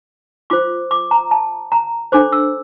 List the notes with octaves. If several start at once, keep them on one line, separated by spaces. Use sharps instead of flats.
F4 C5 D6
D6
A#5
A5
A#5
D4 A4 C5 D6
E6